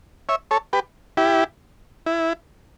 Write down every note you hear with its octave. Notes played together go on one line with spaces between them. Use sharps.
C#5 E5
A4 C#5
G4 B4
E4 G4
E4